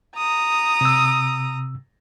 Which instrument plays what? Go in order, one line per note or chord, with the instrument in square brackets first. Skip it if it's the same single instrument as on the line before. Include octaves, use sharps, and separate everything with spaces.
[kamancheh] A#5 D#6
[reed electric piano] C3 E6